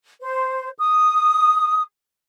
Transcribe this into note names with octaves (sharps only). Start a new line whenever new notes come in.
C5
D#6